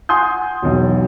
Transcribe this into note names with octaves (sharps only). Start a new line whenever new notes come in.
F#5 G#5 C6 D#6 G6
E1 B1